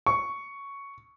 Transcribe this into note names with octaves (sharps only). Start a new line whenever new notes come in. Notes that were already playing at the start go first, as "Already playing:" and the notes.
C#6